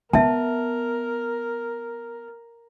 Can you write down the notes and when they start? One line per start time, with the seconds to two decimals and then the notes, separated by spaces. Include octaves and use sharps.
0.13 B3 A#4 E5 A5